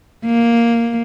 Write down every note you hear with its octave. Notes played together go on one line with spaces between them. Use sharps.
A#3